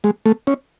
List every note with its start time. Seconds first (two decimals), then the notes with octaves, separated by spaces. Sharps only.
0.04 G#3
0.26 A3
0.47 C#4